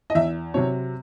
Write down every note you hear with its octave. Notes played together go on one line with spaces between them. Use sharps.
D#5
E2 E5
C3 F#3 C4 C#5